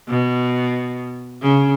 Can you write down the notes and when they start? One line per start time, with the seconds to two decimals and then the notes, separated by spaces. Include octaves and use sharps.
0.09 B2
1.42 C#3